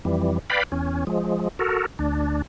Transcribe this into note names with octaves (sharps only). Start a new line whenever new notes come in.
F2 E3 G3
B4 D5 F5 G5 B5
E2 C#4
F3 G#3
F#4 A4 A#4
D2 D4